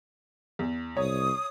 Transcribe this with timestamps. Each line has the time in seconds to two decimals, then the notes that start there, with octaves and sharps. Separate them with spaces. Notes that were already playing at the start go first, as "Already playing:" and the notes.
0.59 E2
0.97 C2 C#5 D#6